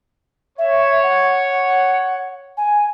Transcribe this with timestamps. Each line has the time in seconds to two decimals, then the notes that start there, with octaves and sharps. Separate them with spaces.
0.58 C#5 E5
1.03 F#5
2.57 G#5